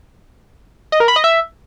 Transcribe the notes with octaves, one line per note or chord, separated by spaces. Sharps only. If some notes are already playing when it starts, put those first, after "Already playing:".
D#5
A#4
B5
D#5
E5